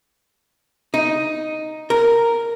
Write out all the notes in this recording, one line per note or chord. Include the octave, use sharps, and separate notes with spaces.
D#4
A#4